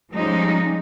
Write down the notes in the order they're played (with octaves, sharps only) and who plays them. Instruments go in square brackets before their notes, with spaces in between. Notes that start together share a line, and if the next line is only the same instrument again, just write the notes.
[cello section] F3 G3 G#3 C#4 D#4